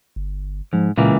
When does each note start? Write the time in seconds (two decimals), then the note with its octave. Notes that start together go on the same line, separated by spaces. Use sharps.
0.16 G1
0.73 G#2 F3
0.98 C#2 A#2 E3 A#3